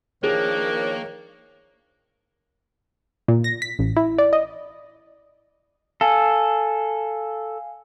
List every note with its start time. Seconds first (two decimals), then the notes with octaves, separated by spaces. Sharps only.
0.24 D#3 F3 A#3 D4 G#4 C#5
3.28 A#2
3.44 A#6
3.62 B6
3.79 A1
3.96 E4
4.19 D5
4.33 D#5
6.01 A4 F5 G#5